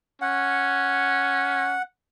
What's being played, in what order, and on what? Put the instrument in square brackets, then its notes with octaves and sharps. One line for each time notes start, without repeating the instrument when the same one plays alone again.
[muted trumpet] C#4 [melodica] F#5